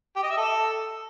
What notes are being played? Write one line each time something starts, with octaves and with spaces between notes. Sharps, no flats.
G4
D#5
E5
A4